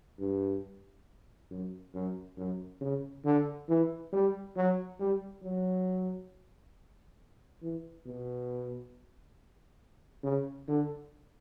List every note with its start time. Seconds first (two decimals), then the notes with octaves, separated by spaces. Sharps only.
0.19 G2
1.51 F#2
1.94 F#2
2.38 F#2
2.81 C#3
3.25 D3
3.69 E3
4.13 G3
4.56 F#3
5.00 G3
5.43 F#3
7.62 E3
8.06 B2
10.23 C#3
10.68 D3